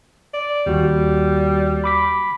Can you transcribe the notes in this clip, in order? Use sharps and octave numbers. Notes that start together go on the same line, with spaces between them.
D5
D#2 G3 F#4
B5 D6 B6